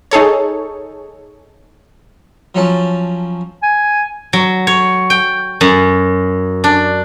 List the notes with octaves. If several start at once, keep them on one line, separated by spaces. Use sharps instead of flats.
D#4 G#4 A4 C#5
F3 F#3 C#4 A5
G#5
F#3
C#5
G5
F#2
D4